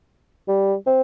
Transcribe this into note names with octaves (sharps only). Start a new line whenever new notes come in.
G3
C4